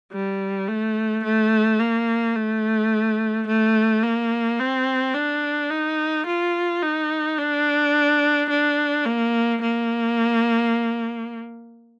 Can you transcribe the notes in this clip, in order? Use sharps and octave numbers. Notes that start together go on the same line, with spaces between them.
G3
A3
A3
A#3
A3
A3
A#3
C4
D4
D#4
F4
D#4
D4
D4
A#3
A#3